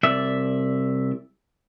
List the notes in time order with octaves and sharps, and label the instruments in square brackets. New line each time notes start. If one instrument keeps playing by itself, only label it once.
[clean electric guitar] C2 D5 E5